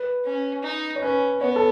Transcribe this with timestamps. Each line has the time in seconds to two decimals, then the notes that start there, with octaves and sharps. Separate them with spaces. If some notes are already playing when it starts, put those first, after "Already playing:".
Already playing: B4
0.25 C#4
0.63 D#4
0.96 C#5
1.02 C#4 B4
1.41 B3 C#5
1.56 A4